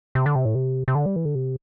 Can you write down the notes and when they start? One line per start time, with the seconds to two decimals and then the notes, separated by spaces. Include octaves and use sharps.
0.15 C3
0.26 D3
0.35 C3
0.45 A2
0.55 C3
0.88 C3
0.95 D3
1.06 G3
1.16 E3
1.25 D3
1.35 C3